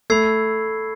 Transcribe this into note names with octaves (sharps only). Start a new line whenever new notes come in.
A3 B5 E6 G#6 C7